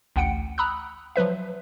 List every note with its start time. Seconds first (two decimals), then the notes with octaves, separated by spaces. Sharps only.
0.16 A1 D2 F#5 G5 C#7 D7
0.58 A#5 B5 D#6 E6 F#6
1.16 F3 F#3 B4 E5